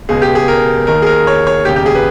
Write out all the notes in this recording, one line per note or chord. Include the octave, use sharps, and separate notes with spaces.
C#2 B2 G#4
G4
G#4
A#4
D#2 D#3 A#4
G#4
A#4
C#5
C#5
E1 D#2 C#3 G4
G4
G#4
B4